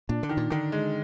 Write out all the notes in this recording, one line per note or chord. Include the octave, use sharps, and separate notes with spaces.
A#2 D4
D3
D#3
A#2
D3 D#3
G#3